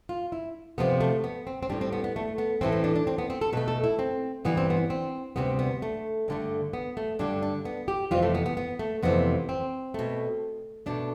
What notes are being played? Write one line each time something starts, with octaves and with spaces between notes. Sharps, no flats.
F4
E4
D2 C3 F3 A3 B3
A3
B3
C4
C4
A2 G3 D4
C4
B3
B3
A3
B3
A2 E3 A3 C4
C4
D4
D4
C4
B3
C4
A4
B2 A3 B4
A4
E4
C4
G2 E3 G3 B3
C4
B3
C4
D2 C3 G3 B3
B3
A3
G2 D3 A3
B3
A3
G2 D3 G3 D4
D4
B3
G4
F2 C3 E3 G3 F4
A3
B3
B3
B3
A3
F2 C3 E3 A3 B3
C4
B2 A3
B2 A3 D4